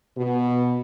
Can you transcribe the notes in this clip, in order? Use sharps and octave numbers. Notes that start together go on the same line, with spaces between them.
B2